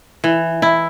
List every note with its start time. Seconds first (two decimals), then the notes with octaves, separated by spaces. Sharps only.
0.24 E3
0.62 E4